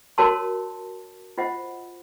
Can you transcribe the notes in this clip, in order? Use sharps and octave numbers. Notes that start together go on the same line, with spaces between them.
F#4 A#4 C#5 A5 C6
F4 C5 D#5 F#5